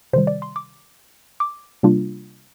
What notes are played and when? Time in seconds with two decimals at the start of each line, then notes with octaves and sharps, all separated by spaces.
0.13 C3 D#3 G3 C5
0.27 D5
0.42 C6
0.56 D6
1.40 D6
1.83 C3 G3 A#3 D4 F4